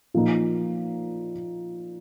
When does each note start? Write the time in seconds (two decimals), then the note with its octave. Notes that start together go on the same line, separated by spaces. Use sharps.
0.14 A#2 F3 A#3 D#4